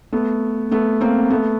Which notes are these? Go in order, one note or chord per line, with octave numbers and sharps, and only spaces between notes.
A3 B3
A3 B3
A#3 C4
A3 B3